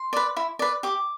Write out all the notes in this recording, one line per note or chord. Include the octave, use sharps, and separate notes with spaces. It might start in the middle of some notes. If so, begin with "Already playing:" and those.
Already playing: C6
B4 D5
E4
B4 D5
G4 D6